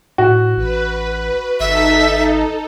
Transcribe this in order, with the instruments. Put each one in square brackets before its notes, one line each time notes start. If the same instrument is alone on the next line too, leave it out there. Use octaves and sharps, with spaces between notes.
[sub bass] A2 [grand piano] F#4
[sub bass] A1 [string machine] B4
[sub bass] G#1 [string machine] D#4 A4 [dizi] E5